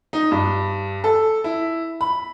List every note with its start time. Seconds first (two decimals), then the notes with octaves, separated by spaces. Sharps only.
0.13 D#4
0.31 G2
1.04 A4
1.44 E4
2.01 B5